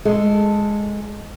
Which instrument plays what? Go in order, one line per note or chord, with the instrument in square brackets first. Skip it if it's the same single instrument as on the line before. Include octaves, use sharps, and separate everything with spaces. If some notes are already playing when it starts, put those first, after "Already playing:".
[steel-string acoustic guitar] G#3 A4